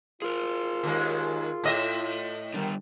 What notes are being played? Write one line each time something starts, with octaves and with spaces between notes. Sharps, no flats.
F4 G#4 A#4
D#2 G#3
A2 D#5 E5
D3 D#3 G3